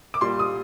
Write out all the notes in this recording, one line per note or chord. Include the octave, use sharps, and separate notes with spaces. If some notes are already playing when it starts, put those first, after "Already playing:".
D6
A#2 G3 C6
D#6